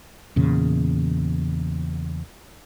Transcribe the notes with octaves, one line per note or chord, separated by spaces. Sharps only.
E2 A#2 C#3